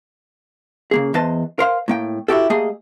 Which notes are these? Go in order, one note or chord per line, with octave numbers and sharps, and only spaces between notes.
C#3 A#3 G#4
E2 B4 C5 D#5 A5
A#4 C5 F5
A2 A#3 G5
E4 F#4 G4 A4
A3 A#3 G4 G#4 D#5